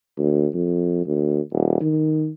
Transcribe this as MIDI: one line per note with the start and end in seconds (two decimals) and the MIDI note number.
0.18 0.47 38
0.54 1.03 41
1.06 1.40 38
1.52 1.77 27
1.81 2.30 51